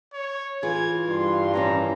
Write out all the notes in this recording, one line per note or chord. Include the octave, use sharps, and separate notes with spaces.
C#5
E3 F4 G#4 G#6
G2 C6
D#2 E3 C#4 A#5